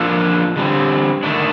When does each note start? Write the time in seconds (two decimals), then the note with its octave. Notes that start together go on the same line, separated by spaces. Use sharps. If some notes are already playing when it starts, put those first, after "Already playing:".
Already playing: F3 A#3 D4 A4
0.56 D3 G3 C4
1.23 D#3 A3 D4